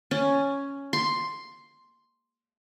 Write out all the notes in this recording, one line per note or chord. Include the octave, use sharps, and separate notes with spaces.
C#4
C6